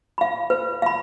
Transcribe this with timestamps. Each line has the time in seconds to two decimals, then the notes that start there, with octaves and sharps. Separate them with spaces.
0.18 F5 B5
0.50 B4
0.82 F5 B5